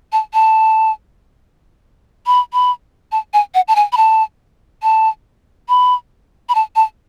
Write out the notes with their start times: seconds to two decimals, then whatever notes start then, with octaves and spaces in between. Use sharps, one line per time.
0.12 A5
0.34 A5
2.27 B5
2.53 B5
3.12 A5
3.34 G#5
3.55 F#5
3.68 A5
3.76 G#5
3.92 B5
3.97 A5
4.83 A5
5.69 B5
6.49 B5
6.55 A5
6.76 A5